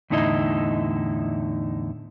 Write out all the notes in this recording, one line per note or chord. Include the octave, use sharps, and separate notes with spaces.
E2 A2 D3 D#4 E4 D#5